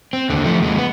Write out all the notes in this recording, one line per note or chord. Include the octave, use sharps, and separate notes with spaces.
C4
D#2 D3
F3 A3
D#2 G#3
B3